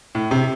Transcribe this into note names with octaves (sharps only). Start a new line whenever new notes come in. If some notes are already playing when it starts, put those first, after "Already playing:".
A2
C3